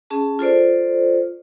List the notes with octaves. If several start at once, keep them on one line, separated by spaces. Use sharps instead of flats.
C#4 G#4 A5
F4 A4 C5 D5